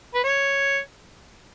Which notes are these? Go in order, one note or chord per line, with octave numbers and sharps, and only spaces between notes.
B4
C#5